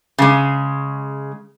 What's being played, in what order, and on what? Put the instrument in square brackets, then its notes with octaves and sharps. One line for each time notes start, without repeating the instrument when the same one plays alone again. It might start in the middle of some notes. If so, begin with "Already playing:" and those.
[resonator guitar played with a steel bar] C#3 G#3